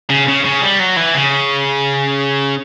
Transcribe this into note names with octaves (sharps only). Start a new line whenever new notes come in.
C#3
C#3
C#3
G3
F#3
E3
C#3